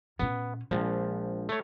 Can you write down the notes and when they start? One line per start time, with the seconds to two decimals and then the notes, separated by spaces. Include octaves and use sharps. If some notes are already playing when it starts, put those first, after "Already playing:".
0.19 A#2 B3 C#4
0.71 A#1 F3 G#3
1.49 A3 C#5